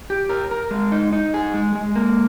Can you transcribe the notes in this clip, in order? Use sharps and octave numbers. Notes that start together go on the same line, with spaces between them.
G4
A#4
A#4
G#3
D#4
D#4
G#4
G#3
G#3
A#3